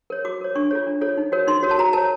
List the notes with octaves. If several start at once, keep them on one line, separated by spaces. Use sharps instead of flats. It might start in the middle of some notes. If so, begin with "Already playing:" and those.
A#4 C#5
F#4 D6
A#4 C#5
D4 C#6
F4 A4 C#5
D4
F4 A4 C#5
D#4
F#4 A#4 C#5
D#4 C6
F#4 A#4 C#5
A5
F#4 A#5
A#4 C#5 A5